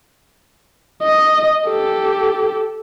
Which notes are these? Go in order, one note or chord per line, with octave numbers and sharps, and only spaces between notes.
D#5
G4 A4